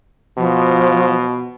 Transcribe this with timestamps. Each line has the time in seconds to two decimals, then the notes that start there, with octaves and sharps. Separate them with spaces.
0.37 B2 F3